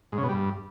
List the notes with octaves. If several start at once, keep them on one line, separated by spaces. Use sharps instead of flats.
G#2
C#3
B2
G3
G2